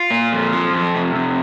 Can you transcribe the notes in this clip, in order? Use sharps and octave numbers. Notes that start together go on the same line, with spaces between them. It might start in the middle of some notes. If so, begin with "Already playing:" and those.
Already playing: F4
A#2
F2
F3
F2
C3
F2